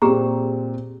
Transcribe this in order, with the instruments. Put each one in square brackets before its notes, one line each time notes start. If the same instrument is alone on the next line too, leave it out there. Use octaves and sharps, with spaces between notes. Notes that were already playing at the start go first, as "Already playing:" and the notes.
[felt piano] A#2 C4 [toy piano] G4 G#4 A#5